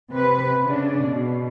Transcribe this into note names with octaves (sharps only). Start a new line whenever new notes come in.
C3 B4
C#3 D4
B2